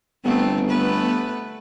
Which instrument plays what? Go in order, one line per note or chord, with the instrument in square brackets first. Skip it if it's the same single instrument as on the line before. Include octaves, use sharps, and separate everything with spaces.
[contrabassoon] G1 [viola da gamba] A3 B3 C4
[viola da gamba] A3 B3 B4